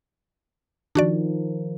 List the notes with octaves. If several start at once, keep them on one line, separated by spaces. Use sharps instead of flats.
D#3 F3 D4 F#4 D5